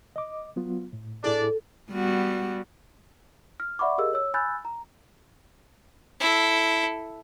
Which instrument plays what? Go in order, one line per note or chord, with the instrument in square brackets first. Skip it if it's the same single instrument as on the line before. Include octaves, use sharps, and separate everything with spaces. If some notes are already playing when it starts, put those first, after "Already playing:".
[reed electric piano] D#5 D6
F#3 B3 F4
A2
[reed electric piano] A2 E4 G#4 [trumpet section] D4 D5 [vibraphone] A4
[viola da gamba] G3 B3 F#4
[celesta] F6
D5 E5 F#5 B5 C#6 D6
G4 G#4 A#4 D#5 F5 E6
C#5 E6
G#5 B5 E6 F#6 G6 A6
A#5
[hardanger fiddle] E4 A4